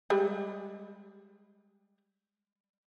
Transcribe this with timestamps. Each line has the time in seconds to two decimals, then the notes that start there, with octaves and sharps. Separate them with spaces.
0.10 G3 G#3